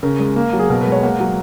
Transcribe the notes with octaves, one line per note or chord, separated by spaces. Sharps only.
C#3 A#4
G#3
A#3
F#3
G#4
B2 A#4
B4
G#3
C#5
A#3 F#5
F#3